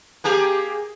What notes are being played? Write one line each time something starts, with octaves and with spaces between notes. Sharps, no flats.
A#3 G4 G#4